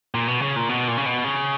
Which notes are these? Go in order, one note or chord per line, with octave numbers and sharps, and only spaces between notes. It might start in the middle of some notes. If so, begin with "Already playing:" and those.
A#2
B2
C#3
A#2
B2
A#2
C#3
B2
C#3